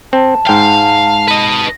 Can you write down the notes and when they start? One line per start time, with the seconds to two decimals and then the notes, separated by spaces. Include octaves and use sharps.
0.13 C4 A5
0.47 G#2 F5 G5
1.28 B4 D#5